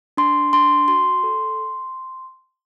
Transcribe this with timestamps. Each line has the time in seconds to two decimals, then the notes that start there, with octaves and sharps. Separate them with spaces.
0.17 D4 C6
0.53 D4 C6
0.88 F#4 C6
1.23 A4